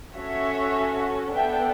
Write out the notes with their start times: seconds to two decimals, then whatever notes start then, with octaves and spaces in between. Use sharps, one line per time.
0.15 C#4 F#4 A4 C#5 E5
1.34 B3 D4 A4 E5 G5